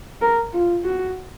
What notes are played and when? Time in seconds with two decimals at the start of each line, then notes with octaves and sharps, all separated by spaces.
0.22 A#4
0.53 F4
0.84 F#4